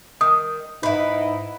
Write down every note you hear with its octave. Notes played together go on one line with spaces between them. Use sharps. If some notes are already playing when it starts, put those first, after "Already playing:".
D#3 D#6
G#2 D#4 E4 B4